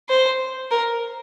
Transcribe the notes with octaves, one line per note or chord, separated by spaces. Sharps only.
C5
A#4